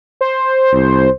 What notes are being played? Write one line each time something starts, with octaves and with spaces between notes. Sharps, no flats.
C5
C2